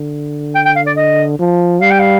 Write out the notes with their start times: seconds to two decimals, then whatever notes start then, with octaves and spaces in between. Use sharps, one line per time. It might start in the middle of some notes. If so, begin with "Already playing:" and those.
Already playing: D3
0.55 G5
0.65 G5
0.76 F5
0.86 D5
0.97 D#5
1.39 F3
1.82 G3 F5
1.91 G5
2.00 F5